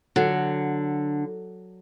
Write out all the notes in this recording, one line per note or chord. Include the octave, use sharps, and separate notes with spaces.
D3 F#3